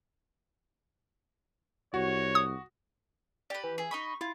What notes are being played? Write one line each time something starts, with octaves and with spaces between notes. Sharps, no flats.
C2 F#4 C#5
D#6
G4 B4 D5
E3
G#4 E5
D#4 D#5 B5 C#6
E4 F4